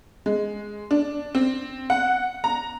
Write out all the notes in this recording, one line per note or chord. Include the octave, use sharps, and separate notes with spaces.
G#3
D4
C4
F#5
A#5